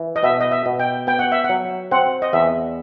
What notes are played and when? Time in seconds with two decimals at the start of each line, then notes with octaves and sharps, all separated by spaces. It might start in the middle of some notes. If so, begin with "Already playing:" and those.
Already playing: E3
0.16 D#5
0.23 B2 E5
0.40 D#5
0.51 E5
0.66 B2
0.79 G5
1.07 B3 G5
1.19 F#5
1.32 E5
1.44 F#5
1.49 F#3
1.91 C4 F#5
2.22 D#5
2.33 E2 E5